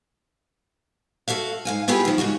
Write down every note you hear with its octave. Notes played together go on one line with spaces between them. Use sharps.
F#4 A4 E5 F5
G#2 F5 G#5
B3 E4 F4 G4 G#4
D#3 F3
G#2 C#3 F4 F#4